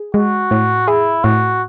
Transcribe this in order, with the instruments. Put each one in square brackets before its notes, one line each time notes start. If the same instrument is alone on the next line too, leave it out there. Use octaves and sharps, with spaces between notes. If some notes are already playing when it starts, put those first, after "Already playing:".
Already playing: [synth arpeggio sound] G#4
[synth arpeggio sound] G#3 [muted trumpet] F#4
[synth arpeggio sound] A2
[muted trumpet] E4 [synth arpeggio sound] G#4
[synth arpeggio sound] A2 [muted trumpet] F#4